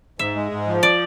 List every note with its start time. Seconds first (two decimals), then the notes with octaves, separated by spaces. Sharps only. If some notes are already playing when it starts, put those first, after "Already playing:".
0.19 G#2 E5
0.36 G#3
0.51 G#2
0.67 F3
0.83 D5